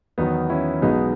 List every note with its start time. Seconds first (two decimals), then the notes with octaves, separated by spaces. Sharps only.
0.18 E2 D#3 F#3 B3 D#4
0.50 C#4 E4
0.82 B1 B2 G#3 B3 D#4